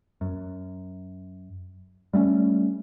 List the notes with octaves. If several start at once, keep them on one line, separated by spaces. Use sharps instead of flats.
F#2
G3 A3 C4 C#4